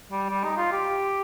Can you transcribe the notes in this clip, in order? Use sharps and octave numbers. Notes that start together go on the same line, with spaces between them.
G3
G3
D#4
F4
G4